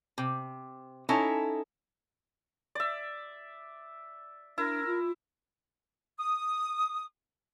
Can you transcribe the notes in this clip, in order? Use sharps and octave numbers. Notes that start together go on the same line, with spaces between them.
C3
C#4 D#4 E4 A4
D5 E5
D4 E4 A#4
F4
D#6